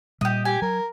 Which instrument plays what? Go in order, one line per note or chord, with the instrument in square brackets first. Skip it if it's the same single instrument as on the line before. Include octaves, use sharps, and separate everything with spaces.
[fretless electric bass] A#2 G3 [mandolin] G4 D#5
[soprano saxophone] G4 [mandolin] G#5
[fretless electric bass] F#3 [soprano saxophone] A#4